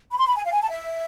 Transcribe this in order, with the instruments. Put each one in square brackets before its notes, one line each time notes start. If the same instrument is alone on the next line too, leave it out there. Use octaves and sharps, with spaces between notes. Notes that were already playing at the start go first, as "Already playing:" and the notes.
[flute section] B5
C6
B5
G#5
F5
G#5
A5
E5